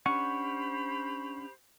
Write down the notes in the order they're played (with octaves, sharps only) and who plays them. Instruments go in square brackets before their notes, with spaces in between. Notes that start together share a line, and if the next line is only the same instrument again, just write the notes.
[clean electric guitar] C#4 D4 F#5 [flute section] G4 C5 B5 [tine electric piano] C#6